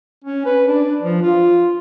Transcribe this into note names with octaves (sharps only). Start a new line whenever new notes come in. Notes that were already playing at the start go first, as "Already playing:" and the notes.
C#4
B4
D4
F3
F4